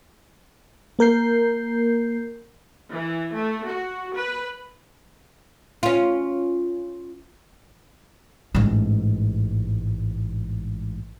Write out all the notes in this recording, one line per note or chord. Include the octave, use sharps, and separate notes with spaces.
A#3 A#4 G6 C7
E3
A3
F#4
B4
C#4 F4
A1 G#2